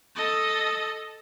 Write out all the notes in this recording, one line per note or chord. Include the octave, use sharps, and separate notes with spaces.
A4 D#5